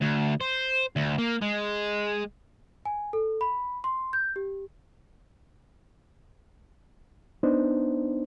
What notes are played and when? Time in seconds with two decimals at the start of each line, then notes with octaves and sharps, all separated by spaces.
0.01 D2
0.41 C5
0.96 D2
1.19 A#3
1.42 G#3
2.85 G#5
3.13 A4
3.41 B5
3.84 C6
4.13 G6
4.36 G4
7.43 B3 D4 D#4 C5